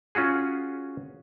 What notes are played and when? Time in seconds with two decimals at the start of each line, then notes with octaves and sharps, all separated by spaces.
0.15 C#4 F4 F#4 G#4